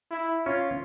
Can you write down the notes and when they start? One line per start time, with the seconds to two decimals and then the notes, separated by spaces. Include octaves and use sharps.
0.11 E4
0.46 C#4 F4